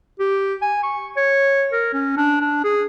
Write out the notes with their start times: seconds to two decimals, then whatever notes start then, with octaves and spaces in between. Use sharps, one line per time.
0.19 G4
0.61 G#5
0.83 C#6
1.17 C#5
1.73 A#4
1.93 C#4
2.17 D4
2.41 D4
2.64 G#4